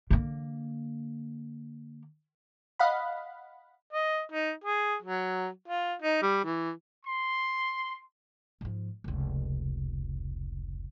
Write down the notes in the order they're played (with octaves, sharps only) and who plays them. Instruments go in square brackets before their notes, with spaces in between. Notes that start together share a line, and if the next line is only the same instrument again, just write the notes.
[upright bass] D3 A#3
[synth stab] D#5 F5 F#5 B5
[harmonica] D#5
D#4
G#4
F#3
F4
D#4
G3
E3
[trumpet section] C6
[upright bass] G#2 F3
F1 C#2